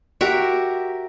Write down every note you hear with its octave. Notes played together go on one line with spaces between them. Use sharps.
F#4 G4 A#4 E5